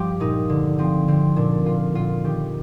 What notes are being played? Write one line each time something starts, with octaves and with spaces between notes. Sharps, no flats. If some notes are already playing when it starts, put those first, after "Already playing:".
Already playing: G2 F3 G4
A#2 D#4
D3
F3 C4
D3 C4
A#2 D4
A#2 F4
A#2 F4
D#3 G4